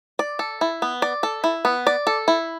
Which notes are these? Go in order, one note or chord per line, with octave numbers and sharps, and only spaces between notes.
D5
A4
E4
B3
D5
A4
E4
B3
D5
A4
E4